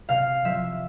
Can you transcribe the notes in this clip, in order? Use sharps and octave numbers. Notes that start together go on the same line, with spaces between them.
C3 F5
F3 E5